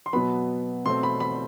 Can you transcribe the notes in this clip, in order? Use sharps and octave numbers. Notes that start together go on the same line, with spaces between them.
C6
B2 F#3 B3 B5
B2 A3 C4 C6
B5
B5